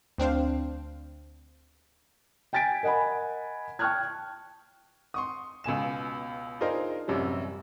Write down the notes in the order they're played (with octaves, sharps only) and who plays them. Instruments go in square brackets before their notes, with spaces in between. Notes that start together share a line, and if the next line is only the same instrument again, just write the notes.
[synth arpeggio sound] D2 C4 D4 C5 F5
[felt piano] G5 G#5 A6 B6 D7
A#4 D#5 F#5 G#5 B5
G5 A5 C#6 F6 F#6 G#6
[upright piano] C6 C#6 D#6
C#2 B2 G#5 E7
D4 D#4 F4 G#4 A#4 C5
A1 F#2 C3 G3